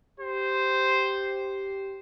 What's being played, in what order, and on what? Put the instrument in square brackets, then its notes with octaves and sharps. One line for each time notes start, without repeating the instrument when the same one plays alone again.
[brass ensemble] G4 [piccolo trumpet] C5